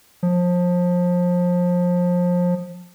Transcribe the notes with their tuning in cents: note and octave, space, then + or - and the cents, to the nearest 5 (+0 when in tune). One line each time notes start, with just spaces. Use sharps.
F3 +25